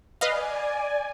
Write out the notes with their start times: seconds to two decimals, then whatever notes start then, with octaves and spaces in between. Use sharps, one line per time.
0.21 B4 D5 D#5 F5 G#5